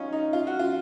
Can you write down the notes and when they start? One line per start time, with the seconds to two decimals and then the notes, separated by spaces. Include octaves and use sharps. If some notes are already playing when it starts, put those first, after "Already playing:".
Already playing: C#4 D#4 F4
0.13 D#4
0.33 F4
0.47 F#4
0.59 F4